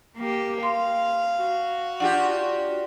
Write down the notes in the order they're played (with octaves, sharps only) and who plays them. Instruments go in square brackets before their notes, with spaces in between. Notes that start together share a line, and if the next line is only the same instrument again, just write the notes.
[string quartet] A#3 G4
[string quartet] F5 [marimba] C6
[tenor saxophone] F#4
[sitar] D4 F4 G4 [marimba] F#5